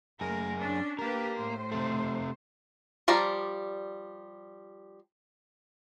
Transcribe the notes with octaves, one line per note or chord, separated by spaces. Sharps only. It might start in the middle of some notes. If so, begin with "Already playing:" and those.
F#2 A3 G#4 A#4
C#4 D4
A#3 D4 G4 A#4 B4
A2 C5
C3 A3
F3 G3 D5 F5 A#5